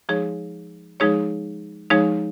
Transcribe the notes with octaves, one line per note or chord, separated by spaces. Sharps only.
F3 G#3 D#4 G#4 C#5
F3 G#3 D#4 G#4 C#5
F3 G#3 D#4 G#4 C#5